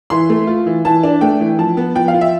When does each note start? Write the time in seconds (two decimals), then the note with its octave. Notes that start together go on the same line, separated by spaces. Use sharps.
0.10 E3 C6
0.30 A3
0.47 F4
0.66 E3
0.85 E3 A5
1.04 D4
1.21 A3 G5
1.40 E3
1.59 F3 A5
1.77 B3
1.95 F3 G5
2.08 F5
2.14 F4
2.21 E5